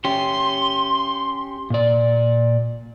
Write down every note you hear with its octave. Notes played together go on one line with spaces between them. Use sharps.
C#4 G4 C6
A#2 D5